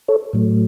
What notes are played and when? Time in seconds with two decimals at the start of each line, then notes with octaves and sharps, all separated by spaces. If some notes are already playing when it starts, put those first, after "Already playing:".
0.08 A4 C#5
0.33 A2 F#3 A3